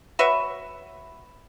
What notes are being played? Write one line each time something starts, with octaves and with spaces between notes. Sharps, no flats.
F#4 B4 C#5 E5